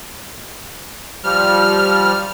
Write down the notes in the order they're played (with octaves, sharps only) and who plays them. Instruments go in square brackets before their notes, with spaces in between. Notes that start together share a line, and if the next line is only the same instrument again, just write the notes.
[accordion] F3 G3 F6